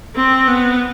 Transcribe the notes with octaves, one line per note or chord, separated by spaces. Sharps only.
C4
B3